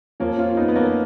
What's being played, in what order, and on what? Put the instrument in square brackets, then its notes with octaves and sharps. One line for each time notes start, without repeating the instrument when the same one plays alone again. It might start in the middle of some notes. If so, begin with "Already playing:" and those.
[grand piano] F2 F3 A#3 C#4
C#4 F4
B3 D#4
B3
A#3 C#4